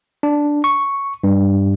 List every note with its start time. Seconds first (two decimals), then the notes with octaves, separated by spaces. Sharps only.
0.23 D4
0.64 C#6
1.24 G2